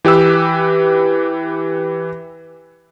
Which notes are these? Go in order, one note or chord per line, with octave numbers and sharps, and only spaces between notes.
E3 G4 B4 E6